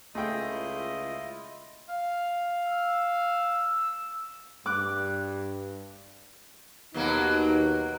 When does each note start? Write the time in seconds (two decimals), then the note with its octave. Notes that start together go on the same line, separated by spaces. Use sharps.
0.15 C#2 A3 E4 F4 G#4 D#5 G5
1.89 F5
2.67 E6
4.66 G2 D6 F#6
6.94 D#2 B2 F#3 A#3 D#4